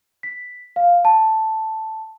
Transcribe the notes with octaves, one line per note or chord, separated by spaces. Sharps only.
B6
F5
A5